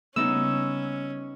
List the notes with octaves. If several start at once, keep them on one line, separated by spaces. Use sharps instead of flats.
C#3 G3 B3 C#4 D#4 E6